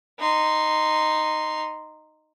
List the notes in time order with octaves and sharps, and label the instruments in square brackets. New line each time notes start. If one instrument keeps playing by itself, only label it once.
[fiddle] D#4 C6